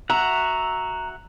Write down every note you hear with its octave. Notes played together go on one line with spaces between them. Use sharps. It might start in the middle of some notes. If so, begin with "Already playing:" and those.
F#4 E5 F#5 A#5